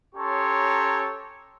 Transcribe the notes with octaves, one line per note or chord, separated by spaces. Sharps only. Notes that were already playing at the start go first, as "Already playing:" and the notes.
C#4 G4 A4 C#5 A#5 C6